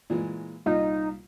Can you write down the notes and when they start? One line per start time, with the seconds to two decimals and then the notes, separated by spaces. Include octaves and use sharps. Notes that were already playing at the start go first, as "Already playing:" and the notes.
0.10 A#2 E3 G#3
0.66 C2 A#2 D#4 F4